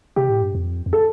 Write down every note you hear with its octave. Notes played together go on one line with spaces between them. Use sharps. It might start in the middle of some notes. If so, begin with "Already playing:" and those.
C3 G4
A2
G2
F2
F2
A4